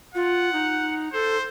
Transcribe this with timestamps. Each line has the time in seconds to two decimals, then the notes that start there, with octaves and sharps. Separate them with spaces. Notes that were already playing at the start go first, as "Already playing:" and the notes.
0.15 F4 F#5
0.52 D#4
1.13 A4 C5